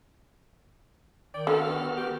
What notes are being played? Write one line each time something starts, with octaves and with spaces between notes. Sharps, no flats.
D#3 D5 G5
D3 B3 F#4 A4 F6
G4